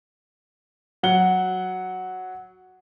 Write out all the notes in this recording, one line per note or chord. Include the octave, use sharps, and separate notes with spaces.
F#3 F#5 G7